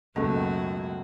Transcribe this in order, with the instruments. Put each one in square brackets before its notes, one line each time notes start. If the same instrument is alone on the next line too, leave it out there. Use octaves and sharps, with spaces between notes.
[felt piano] C#2 [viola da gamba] F#2 F#4 [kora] B2 A3 B4 [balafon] A#3